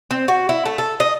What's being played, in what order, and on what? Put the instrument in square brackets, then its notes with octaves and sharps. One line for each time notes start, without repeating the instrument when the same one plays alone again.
[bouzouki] C4
F#4
E4
A3
A4
D#5